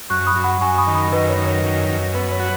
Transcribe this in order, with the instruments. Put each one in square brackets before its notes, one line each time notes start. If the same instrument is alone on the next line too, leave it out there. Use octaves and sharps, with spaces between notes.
[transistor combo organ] F#2 [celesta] C#6 F#6
[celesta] B5 D#6
[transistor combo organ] F#2
[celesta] F#5 B5
[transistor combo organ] F#2 [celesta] G#5 C#6
[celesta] B5 D#6
[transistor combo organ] D#3
[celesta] B5 D#6
[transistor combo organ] F#2 [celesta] B4 D#5
[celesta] C#5
[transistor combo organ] D#3
[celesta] C#5
[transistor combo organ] F#2
F#2
[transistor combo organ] B3 [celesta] B4
[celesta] C#5
[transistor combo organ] F#4